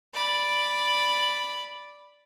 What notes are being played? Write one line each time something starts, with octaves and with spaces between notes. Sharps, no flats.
D5 B5